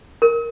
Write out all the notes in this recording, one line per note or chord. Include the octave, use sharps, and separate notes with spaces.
A#4